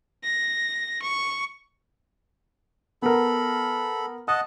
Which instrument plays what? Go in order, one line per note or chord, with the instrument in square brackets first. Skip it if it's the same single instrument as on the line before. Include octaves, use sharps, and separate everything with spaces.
[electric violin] A#6
C#6
[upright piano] B3 A#4 [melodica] A4 B5
[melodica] D#5 F#5 A5 [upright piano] D#6